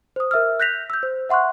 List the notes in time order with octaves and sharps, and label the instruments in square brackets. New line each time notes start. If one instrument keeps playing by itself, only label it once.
[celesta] C5 D#6
A#4 E5 E6 F6
F#6 G6 A#6 B6 F7
E6 G6
C5
E5 F#5 C6 C#6 F#6